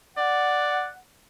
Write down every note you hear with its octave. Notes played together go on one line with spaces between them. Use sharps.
D5 F#5